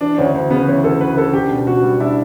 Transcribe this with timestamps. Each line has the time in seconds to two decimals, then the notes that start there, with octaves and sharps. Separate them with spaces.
0.01 E3 D4
0.18 D2 C#4
0.34 D2
0.50 C#3 B3
0.67 E3 C#4
0.84 D2 A4
1.00 D2 B4
1.18 C#3 A4
1.33 D4 G4
1.51 B2
1.67 B2 F#4
1.83 G3
2.00 D4 E4